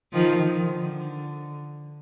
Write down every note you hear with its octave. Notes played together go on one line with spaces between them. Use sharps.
D#3 F3
D#3
D3